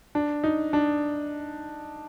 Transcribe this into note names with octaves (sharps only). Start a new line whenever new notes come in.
D4
D#4
D4